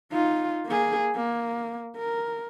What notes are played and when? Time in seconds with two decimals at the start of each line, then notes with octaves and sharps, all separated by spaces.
0.12 D#4 F4
0.66 A#3 G#4
1.16 A#3
1.98 A#4